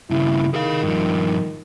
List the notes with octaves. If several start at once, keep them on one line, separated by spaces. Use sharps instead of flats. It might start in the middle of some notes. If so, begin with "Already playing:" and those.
G2 C#3 E4
D#3 G#4 F5
G2 F3